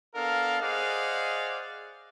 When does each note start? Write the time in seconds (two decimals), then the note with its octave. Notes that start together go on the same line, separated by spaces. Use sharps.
0.16 B3 D4 A4 A#4 F5
0.61 G#4 C5 D5 D#5 F5 F#5